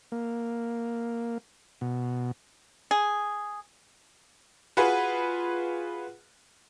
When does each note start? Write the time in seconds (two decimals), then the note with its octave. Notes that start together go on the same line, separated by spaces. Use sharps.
0.12 A#3
1.81 B2
2.91 G#4
4.77 F4 F#4 G#4 B4